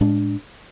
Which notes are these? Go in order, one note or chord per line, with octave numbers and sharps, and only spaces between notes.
A2 G#3 D4